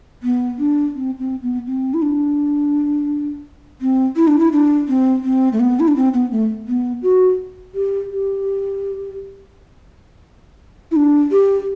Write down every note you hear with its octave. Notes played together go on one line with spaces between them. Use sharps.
B3
D4
C4
C4
B3
C4
E4
D4
C4
E4
D4
E4
D4
C4
C4
A3
B3
E4
D4
C4
B3
A3
B3
F#4
G4
G4
E4
D4
G4